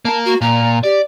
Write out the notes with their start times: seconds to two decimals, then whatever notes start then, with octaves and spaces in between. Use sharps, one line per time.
0.05 A#3 A#4 A5
0.25 F#4
0.42 A#2 A#5
0.84 G4 D5